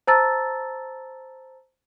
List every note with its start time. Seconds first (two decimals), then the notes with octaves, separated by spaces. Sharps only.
0.07 C5 A5 A#5 E6 A6